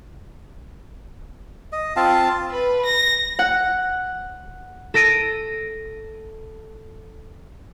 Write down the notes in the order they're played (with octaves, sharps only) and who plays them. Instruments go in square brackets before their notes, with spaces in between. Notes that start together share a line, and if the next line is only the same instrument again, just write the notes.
[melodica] D#5
C4 F4 F5 A5
[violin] B4
A#6
[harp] F#5
A4 A#6 D7 D#7